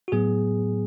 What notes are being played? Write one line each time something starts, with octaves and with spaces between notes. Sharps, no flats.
F#4
A2 F#3 B3 G#4